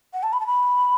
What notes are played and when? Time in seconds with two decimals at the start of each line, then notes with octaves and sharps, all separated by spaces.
0.13 F#5
0.23 A5
0.33 B5
0.40 A5
0.46 B5